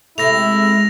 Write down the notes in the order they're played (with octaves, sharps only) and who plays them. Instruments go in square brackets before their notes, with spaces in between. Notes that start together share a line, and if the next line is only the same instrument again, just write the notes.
[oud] C3 A3 [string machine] G#3 F6 [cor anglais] E4 [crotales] A#6 F7